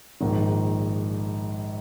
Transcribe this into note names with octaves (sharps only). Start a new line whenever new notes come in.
A#1 G#2 D#3